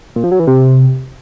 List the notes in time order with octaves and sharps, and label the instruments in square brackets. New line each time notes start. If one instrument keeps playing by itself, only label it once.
[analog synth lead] A#2
F3
F#3
E3
C3